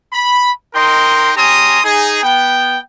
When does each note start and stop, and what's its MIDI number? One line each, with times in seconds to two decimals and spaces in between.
0.13 0.51 83
0.75 1.32 63
0.75 1.32 70
0.75 1.32 75
0.75 1.32 79
0.75 1.32 84
1.37 1.79 61
1.37 1.79 67
1.37 1.79 80
1.37 1.79 82
1.37 1.79 84
1.37 1.79 87
1.84 2.23 63
1.84 2.23 68
2.23 2.78 59
2.23 2.78 79